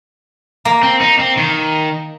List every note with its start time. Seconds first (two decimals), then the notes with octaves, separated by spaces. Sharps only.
0.65 A#3
0.83 C4
1.01 D#4
1.19 C4
1.37 D#3